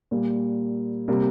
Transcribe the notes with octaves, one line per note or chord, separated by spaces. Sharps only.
A#2 G3 A#3
C3 G3 A#3